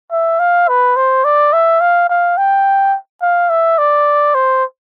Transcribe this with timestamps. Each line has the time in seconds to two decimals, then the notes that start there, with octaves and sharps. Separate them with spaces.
0.12 E5
0.39 F5
0.69 B4
0.96 C5
1.25 D5
1.53 E5
1.81 F5
2.09 F5
2.37 G5
3.22 F5
3.50 E5
3.79 D5
4.35 C5